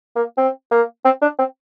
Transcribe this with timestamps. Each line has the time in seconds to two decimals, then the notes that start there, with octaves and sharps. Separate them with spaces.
0.16 A#3
0.38 C4
0.72 A#3
1.05 C4
1.22 D4
1.39 C4